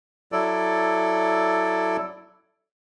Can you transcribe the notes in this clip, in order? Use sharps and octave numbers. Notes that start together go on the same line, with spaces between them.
F#3 E4 A4 D5